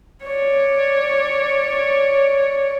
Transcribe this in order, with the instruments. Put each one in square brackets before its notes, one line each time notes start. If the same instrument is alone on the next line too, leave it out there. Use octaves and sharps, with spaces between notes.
[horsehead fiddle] C#5 D5